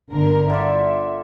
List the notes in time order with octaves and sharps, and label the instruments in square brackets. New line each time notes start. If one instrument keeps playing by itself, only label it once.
[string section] G1 D3 A#4
[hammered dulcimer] D3 F4 D5 [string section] E5